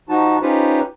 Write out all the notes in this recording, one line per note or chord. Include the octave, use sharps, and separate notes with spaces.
F3 D#4 F#4 A5
C#4 D#4 F4 G4 B4 C5